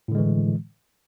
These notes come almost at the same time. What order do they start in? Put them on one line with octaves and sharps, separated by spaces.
A2 D3 G#3 E3